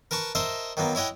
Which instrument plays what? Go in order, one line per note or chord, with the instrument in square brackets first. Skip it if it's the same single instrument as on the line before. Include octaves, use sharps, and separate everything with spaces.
[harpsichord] A#4 B4 A5 C#6
A#4 C5 D#5 E5 A5
D#3 F#3 A#3 B3
E4 C#5 D#5 F#5 G5